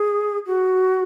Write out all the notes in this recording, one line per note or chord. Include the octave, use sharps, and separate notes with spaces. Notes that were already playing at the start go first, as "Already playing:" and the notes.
Already playing: G#4
F#4